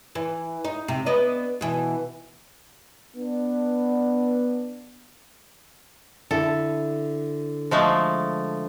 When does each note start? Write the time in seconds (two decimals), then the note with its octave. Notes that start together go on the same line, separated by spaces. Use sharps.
0.15 E3
0.65 D#4
0.88 C3
1.06 B3 D4 D#5
1.61 B2 E3
3.15 B3 D4
6.31 D3 E4 A4
7.71 F3 G#3 A3